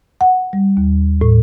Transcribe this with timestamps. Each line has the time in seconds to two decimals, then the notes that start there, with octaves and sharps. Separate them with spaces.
0.21 F#5
0.53 G3
0.77 D#2
1.21 A2